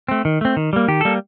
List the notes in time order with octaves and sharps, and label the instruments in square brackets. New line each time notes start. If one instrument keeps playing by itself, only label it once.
[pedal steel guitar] A3 C4
D#3
A3 C4
D#3
G3 A#3
D#3 G4
G3 A#3 A4